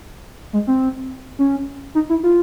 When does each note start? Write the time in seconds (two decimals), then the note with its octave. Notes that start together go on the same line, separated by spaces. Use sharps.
0.53 G#3
0.67 C4
1.39 C#4
1.95 D#4
2.09 E4
2.23 F4